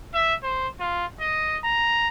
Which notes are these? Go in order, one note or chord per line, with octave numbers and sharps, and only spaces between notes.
E5
C5
F4
D#5
A#5